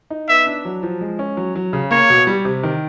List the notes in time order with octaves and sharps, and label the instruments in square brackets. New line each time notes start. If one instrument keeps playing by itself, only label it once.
[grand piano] D#4
[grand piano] B3 [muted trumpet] E5
[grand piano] D4
F#3
F3
G#3
C#4
F#3
F#3
C#3
[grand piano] A#3 [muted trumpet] C#5
[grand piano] B2
G3
C3
D#3